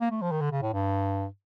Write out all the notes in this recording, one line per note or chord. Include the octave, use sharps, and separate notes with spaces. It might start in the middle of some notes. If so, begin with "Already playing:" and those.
A#3
A3
F3
D#3
D3
C#3
A2
G2